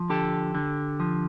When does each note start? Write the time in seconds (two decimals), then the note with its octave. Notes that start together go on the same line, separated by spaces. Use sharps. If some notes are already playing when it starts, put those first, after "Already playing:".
Already playing: F3
0.10 D3 G4 A4
0.55 D3
1.00 F3